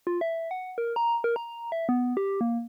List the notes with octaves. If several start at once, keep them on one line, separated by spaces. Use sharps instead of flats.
F4
E5
F#5
A#4
A#5
A#4
A#5
E5
B3
G4
A#3